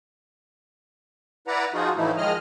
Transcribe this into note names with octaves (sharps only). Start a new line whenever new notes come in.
E4 B4 D5 F#5 A#5
F3 D#4 F4 F#4 G#4
A2 E3 F3 A3 D#4 E4
D#3 F3 G#3 G#4 D#5 F6